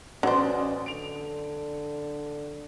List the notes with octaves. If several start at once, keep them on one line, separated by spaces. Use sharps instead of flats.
A1 F#3 C#4 B4 C5 D5
D3 D7 F7